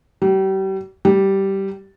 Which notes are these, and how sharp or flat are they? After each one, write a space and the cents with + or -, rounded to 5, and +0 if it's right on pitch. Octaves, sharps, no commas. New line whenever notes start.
G3 -35
G3 -10